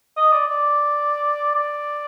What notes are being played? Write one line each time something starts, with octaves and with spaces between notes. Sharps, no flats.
D#5
D5
D5
D5